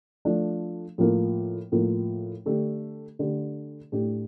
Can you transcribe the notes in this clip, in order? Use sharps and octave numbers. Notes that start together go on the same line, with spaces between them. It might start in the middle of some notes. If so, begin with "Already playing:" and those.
F3 A3 D4
A2 F3 A#3 F4
A2 F3 A#3 F4
D3 A3 D4 G4
D3 A3 D4 G4
A2 A3 D4 G4